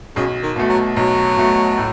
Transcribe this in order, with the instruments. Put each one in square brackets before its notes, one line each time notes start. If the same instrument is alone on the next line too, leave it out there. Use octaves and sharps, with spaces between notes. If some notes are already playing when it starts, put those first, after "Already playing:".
[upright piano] B1 [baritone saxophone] C#3
[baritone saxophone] D#3
[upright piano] B2 A3
[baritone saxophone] F#3
[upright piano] B1 [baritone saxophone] F#3
[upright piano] B2 A3
A2